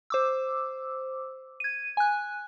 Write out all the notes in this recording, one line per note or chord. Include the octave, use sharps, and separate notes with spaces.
C5 D6 E6
G#6 D#7
G#5 F#6